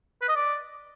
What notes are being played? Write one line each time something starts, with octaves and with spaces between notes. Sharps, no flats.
B4
D#5
D5